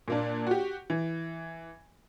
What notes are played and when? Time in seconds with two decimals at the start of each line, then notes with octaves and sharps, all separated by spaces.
0.08 A#2 A#3 D4
0.47 F#4 G4
0.90 E3